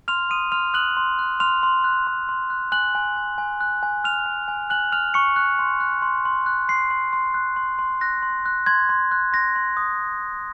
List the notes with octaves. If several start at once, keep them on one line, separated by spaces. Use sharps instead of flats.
C6 F6 F7
C6 D#6 D#7
C6 F6 F7
D#6 F#6 F#7
C6
F#6
C6 F6 F7
C6
F#6
C6
C6
F#6
G#5 F#6 F#7
G#5
G#5
G#5
F#6
G#5
G#5 F6 F7
G#5
G#5
G#5 F#6 F#7
F6 F#6 F7
C#6 C#7
F#6
C6
F#6
C6
C6
F#6
C6 F#6 C7
C6
C6
F#6
C6
C6
F#6 A#6
C6
F#6
C6 G#6
C6
F#6
C6 A#6
C6
D#6